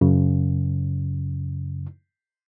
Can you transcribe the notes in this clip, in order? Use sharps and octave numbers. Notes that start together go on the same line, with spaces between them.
F#2 C#3